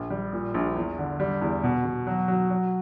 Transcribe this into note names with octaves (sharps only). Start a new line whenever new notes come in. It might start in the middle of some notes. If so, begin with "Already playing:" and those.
Already playing: A#1
G3
A#2
A#1
E2
D3
G3
E2
B2
B2
F#3
F#3
F#3